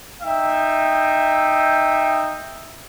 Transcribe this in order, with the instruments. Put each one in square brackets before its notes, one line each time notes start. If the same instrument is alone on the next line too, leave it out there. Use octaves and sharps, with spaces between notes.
[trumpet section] D#4 E5 G5